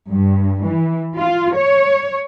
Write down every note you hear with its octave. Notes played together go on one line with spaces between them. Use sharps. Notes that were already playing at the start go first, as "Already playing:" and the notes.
G2
E3
F4
C#5